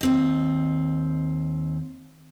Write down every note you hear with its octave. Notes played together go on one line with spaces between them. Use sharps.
D#2 C4 D#5